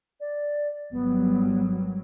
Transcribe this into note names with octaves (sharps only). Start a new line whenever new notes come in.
D5
G#1 F#3 G3 B3